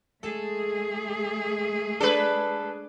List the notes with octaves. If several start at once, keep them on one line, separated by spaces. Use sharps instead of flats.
G#3 A3 G#4 A4 A5
D4 A4 B4 G#5 B5